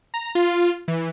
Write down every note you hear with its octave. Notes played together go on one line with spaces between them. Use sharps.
A#5
F4
E3